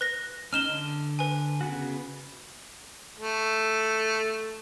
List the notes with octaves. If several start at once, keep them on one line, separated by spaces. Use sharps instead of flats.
B4 F#6 A#6
C#4 D#4 F6 E7 G7
D3
B4 G#5
C#3 B3 F#4
A3